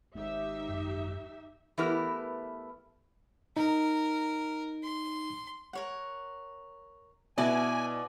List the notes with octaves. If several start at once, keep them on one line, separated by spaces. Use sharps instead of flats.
G#1 G#2 D#4 G4 E5
F#2
E3 A3 B3 E4 G4 A#4
D#4 A#4
C6
A#4 C#5 F#5
B2 E4 F#4 D5 G#5